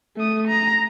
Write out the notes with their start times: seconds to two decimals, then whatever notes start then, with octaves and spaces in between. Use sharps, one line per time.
0.17 A3 D#6
0.47 A#5